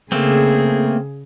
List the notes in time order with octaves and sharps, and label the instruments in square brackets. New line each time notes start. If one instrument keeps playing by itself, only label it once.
[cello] C#3 G#4 [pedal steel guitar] A3 A#3 C4